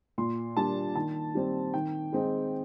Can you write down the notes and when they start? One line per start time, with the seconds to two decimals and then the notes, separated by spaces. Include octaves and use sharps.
0.18 A#2 C6
0.57 G3 A#3 D4 A5
0.95 D#3 A5
1.35 G3 C4
1.74 D#3 G5
2.12 G#3 C4 D#4